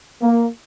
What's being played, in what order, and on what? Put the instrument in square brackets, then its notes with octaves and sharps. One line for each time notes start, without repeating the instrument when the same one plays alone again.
[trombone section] A#3